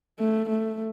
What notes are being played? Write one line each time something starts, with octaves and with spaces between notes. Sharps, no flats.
A3
A3